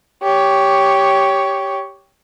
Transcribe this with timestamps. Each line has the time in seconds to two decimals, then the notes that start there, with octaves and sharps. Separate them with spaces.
0.23 G4 C#5